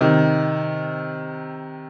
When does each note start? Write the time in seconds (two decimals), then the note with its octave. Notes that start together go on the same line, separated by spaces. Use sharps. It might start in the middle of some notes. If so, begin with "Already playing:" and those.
0.01 C3 D#3